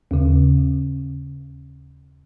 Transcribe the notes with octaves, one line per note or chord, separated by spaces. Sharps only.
D#2 C#3